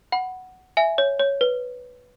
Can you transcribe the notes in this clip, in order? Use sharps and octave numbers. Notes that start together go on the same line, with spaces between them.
F#5 B5
E5 G#5
C#5
C#5
B4